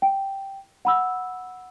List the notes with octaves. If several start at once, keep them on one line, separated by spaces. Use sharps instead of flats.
G5
F#5 B5 E6